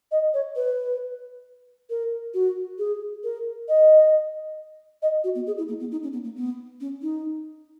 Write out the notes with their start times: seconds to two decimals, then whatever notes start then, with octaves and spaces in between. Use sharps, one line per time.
0.11 D#5
0.33 C#5
0.55 B4
1.89 A#4
2.34 F#4
2.78 G#4
3.23 A#4
3.68 D#5
5.02 D#5
5.23 F#4
5.35 B3
5.46 G#4
5.57 E4
5.68 A#3
5.79 B3
5.91 D#4
6.02 C#4
6.12 B3
6.24 A#3
6.36 B3
6.80 C#4
7.02 D#4